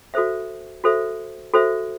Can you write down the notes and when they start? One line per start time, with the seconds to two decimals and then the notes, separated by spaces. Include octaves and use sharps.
0.14 F#4 A4 C5 E5
0.84 F#4 A4 C5 E5
1.54 F#4 A4 C5 E5